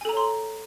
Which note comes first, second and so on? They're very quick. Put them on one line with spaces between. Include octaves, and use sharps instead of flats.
G#5 A4 A#5 C#5 C6